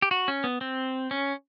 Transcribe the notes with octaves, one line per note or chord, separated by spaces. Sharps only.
G4
F#4
C#4
B3
C4
C#4